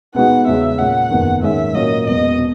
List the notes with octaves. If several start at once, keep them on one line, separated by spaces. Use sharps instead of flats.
B2 G#3 B3 D#4 F#4 F#5
E2 C#3 G#3 C#4 E5
A#2 G#3 C#4 F#5
F#1 E2 D#3
G#2 D#3 G#3 C#4 G#4 E5
A#2 F#3 A#3 C#4 D#5
E1 E2 B2 F#3 D#5
B2